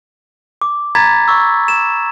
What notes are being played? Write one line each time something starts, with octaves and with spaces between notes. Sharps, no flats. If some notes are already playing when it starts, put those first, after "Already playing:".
D6
A#5 B5 G#6 A6 B6
C#6 E6
E7